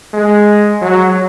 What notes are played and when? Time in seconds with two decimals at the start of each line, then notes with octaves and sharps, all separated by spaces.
0.14 G#3
0.81 F#3